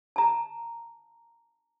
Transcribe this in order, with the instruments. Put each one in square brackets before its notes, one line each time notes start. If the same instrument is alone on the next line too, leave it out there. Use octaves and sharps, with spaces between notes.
[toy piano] A5 A#5